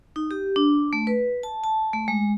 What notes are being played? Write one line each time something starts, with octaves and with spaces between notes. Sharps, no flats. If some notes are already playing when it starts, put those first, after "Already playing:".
D#4
G4
D4
A3
B4
A5
A5
A3
G#3